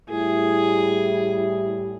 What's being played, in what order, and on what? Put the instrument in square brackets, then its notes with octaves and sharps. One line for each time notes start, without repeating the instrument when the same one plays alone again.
[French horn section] A2 G3 E4 [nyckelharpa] G#4